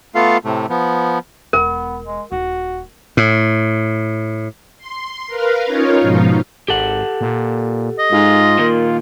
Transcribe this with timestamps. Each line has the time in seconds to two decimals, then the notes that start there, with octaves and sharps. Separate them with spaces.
0.15 A3 B3 F4 A4 F5
0.44 A2 C3 A3
0.70 F3 B3
1.53 E1 B3 A#4
2.05 G#3
2.32 D#1 F#4
3.17 A2
4.77 C6
5.27 A#4 B4 F5
5.65 C#4 D#4 F4 A#4 C#5
6.00 G#2 B2 F3 D#4 F4
6.68 G#1 G4 A4 F#5
7.21 A#2
7.99 D#5
8.12 G#2 F4
8.59 A#2 D#3 A#3